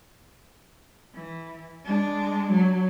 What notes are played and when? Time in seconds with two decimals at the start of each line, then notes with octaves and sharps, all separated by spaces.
1.14 E3
1.85 G#3 D4
2.51 F#3